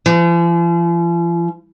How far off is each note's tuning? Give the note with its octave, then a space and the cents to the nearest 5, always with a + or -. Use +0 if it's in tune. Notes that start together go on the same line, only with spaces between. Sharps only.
F3 -45